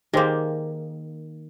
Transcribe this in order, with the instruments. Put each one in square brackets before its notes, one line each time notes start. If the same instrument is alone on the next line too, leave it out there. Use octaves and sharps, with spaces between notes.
[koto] D#3 A#3 [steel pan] G4 G#4 C5